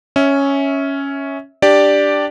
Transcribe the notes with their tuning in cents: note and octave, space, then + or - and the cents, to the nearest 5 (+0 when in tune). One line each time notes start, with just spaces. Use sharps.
C#4 +0 E5 -20
D4 +0 G4 +0 D5 +0